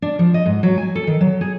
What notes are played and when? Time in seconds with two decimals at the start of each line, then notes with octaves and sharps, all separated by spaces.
0.02 D4
0.19 F3
0.34 D#5
0.46 G#2
0.63 F#3
0.78 G#5
0.95 A4
1.07 D#3
1.21 F#3
1.41 G#4